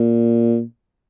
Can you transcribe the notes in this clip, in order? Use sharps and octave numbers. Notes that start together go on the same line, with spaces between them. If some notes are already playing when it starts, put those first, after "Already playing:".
Already playing: A#2